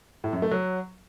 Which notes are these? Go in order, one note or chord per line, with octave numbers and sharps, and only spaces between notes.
A2
F#2
A3
F#3